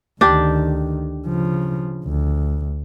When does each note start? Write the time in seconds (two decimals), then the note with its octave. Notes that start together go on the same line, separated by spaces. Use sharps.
0.21 D2 D#3 D4 G4
1.27 C#3 F3
2.04 D2